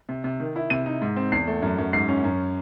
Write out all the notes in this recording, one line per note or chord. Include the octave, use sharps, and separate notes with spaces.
C3
C3
D#3
E4
C3 D#7
D#4
G#2
C4
E2 C7
A3
F#2
F#2
G#2 C7
C#4
F#2